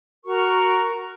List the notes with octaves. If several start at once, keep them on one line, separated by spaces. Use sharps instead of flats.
F#4 A#4 A#5 C#6